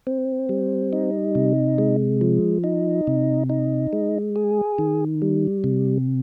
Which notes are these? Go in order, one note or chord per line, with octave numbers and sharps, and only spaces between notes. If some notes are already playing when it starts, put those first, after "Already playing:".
C4
G3
D#4
C3
G#3
F3
D#4
C3
D#4
G#3
G#4
D#3
G3
C3